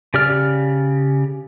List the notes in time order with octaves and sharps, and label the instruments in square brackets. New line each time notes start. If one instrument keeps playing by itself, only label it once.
[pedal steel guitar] C#3 G4 D5 F6